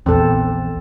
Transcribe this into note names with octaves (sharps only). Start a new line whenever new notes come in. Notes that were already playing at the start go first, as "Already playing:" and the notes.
A#1 E2 C4 A4